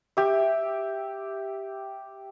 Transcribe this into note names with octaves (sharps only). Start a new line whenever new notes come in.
G4 E5